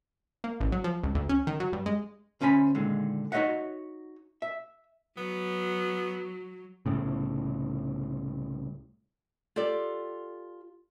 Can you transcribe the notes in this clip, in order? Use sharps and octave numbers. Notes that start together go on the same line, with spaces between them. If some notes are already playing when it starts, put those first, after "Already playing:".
A#3
A1
F#3
F3
C#2
D2
C#4
D#3
F#3
G2
G#3
D2 C#4 C5 G#5 B5
A#2 D3 D#3 G#3
D#4 F#4 C#5 D#5 E5 F#5
E5
F#3 B3
C2 A2 C#3
F4 G4 A4 D5